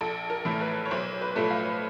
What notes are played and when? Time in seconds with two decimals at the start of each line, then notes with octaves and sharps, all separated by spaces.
0.01 A#1 A4
0.30 A#4
0.45 A2 E3 A3
0.61 B4
0.86 C#5
0.91 B1 C5
1.21 B4
1.36 A2 F3 A3
1.50 F5